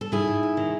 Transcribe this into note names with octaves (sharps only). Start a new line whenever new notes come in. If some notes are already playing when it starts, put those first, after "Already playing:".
A4
G#2 E4 G#4
G#2
G#2
D#3